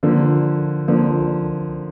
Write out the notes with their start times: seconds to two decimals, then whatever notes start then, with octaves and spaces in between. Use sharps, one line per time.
0.03 D3 F3 A#3
0.88 D3 F3 A#3